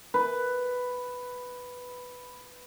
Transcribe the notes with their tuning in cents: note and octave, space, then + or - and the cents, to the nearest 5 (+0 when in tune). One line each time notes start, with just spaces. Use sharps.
B4 +5